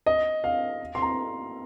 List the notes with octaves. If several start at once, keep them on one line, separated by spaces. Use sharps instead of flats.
D#5
F5
C6
A#5